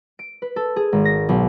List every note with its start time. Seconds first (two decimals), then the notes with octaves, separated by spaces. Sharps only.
0.19 D7
0.42 B4
0.56 A4
0.76 G#4
0.92 G#1
1.05 A#6
1.29 B1